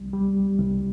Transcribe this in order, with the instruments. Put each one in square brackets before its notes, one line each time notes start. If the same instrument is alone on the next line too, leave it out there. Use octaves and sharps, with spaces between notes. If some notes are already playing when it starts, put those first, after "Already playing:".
Already playing: [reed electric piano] C2 G3
G3
C2